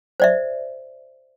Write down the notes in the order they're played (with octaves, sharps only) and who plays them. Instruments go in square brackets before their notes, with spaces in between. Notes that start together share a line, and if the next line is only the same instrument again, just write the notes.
[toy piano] C5 D5 E5